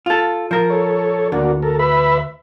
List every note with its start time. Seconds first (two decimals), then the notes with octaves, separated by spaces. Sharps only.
0.06 F4 A4
0.51 F3 A#4
0.70 A4 C#5
1.32 D2 A#3 D4 F#4
1.62 A4 A#4
1.79 B4 E5 B5